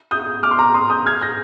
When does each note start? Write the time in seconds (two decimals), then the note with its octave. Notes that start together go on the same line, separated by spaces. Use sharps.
0.11 D#6 G6
0.43 D6 F6
0.51 C6
0.59 A#5 D6
0.74 C6 D#6
0.90 D#6 G6
1.06 F6 G#6
1.21 G6 A#6